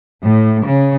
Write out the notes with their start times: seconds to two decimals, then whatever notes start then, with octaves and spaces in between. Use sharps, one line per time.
0.24 A2
0.66 C#3